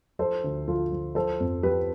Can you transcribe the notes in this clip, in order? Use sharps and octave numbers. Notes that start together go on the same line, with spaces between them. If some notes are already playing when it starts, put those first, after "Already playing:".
F3 A4 C5
D2
F3 F4 A4
F3
F3 A4 C5
F2
F3 G4 B4